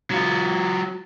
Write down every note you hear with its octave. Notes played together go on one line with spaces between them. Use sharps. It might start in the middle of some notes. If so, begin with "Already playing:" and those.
F#3 F4